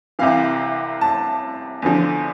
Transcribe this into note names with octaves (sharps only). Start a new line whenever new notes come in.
C2 C3 E3 F5
A5
E2 D3 F3